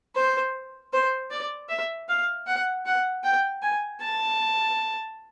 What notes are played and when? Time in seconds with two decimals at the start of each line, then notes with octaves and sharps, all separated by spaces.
0.15 C5
0.93 C5
1.31 D5
1.69 E5
2.09 F5
2.47 F#5
2.86 F#5
3.24 G5
3.62 G#5
4.01 A5